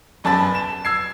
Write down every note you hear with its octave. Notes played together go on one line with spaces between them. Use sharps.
G1 F#2 A5 B5 A6
E7
E6 G#6 C7